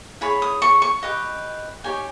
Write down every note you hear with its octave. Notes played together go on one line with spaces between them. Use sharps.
E4 G#4 C#5 B5
D#6
C#6
C#6
G4 B4 D#5
D#4 G4 C#5 G#5